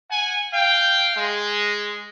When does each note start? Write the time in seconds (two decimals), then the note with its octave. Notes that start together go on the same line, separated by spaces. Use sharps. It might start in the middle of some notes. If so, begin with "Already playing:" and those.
0.10 F#5 G#5
0.52 F5 G5
1.15 G#3